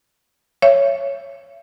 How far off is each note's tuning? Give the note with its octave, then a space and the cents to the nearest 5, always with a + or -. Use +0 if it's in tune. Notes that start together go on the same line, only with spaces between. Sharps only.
C#5 +0 E5 +40